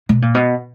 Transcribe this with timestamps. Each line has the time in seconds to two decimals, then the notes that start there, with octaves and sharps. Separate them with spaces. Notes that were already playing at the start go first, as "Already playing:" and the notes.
0.09 B2
0.22 A#2
0.35 B2